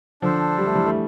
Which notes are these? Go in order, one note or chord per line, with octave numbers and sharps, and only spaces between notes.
D3 F3 D4 A4 C5
G3
A3
E3 G3
A3